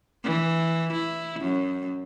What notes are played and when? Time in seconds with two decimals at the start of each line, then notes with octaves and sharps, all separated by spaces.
0.24 E3
0.94 E4
1.40 F#2